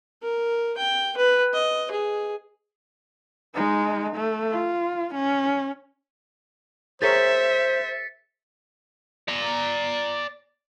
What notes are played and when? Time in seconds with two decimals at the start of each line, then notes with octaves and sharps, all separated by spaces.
0.23 A#4
0.77 G5
1.17 B4
1.54 D#5
1.91 G#4
3.55 G#3 D#4
4.16 A3
4.51 F4
5.15 C#4
7.02 G#4 A#4 C5 C#5 E5 A6 B6 C#7
9.28 D5 A#5